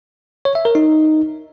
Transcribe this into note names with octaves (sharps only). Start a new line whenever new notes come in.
C#5
E5
A#4
D#4